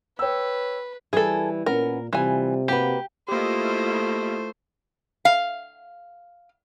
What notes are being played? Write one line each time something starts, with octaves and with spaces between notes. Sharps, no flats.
B4 C#5 G5 E6
E3 G3 G#4 A4
A#2 B3 C#4 A#4
C3 E3 G3 F4 G#5
A#3 F#4 G4 B4
A3 A#3 E4 F4 G4 C5 D#5
F5